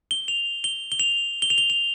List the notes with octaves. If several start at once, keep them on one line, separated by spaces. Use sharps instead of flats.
G7
F7
G7
G7
F7
G7
F7
G7
F7